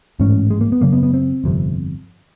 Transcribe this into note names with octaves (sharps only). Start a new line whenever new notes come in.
A1 G#2 C#4
G#3
A#3
B3
F#1 F#2 C#3 A#3
B3
B3
C4
G1 F2 C3